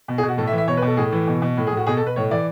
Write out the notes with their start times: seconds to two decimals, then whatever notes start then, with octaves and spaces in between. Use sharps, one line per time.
0.08 B2
0.18 G#4
0.23 B2
0.28 F#4
0.37 A2 A4
0.47 E5
0.52 E3
0.58 E5
0.68 B2 C#5
0.77 B4
0.82 B2 A4
0.97 A2 G#4
1.12 E3
1.27 B2
1.42 B2
1.57 A2
1.67 G#4
1.71 A2
1.77 F#4
1.87 B2 G#4
1.97 A4
2.02 B2 B4
2.16 A2 C#5
2.31 E3 D5